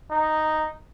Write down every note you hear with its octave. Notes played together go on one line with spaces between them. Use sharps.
D#4